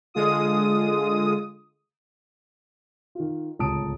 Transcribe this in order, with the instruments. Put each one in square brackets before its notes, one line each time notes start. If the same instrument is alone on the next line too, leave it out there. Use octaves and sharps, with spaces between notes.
[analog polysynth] D3 G#3 F4 D#6
[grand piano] D#3 F4
D1 C#2 A5 A#5 D#6 D7